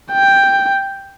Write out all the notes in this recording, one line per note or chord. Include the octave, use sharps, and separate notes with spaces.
G5